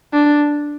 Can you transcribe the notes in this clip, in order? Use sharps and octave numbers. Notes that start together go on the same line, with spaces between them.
D4